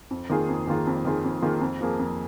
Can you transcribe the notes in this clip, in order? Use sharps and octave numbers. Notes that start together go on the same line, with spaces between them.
F2
D#3 A#3 F4 G#4
F2
D#3 A#3 F4 G#4
F2
D#3 A#3 F4 G#4
F2
D#3 A#3 F4 G#4
F2
F3 A#3 G#4
F2